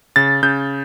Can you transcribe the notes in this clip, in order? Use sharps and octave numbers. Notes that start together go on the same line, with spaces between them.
C#3 A6
C#3 G6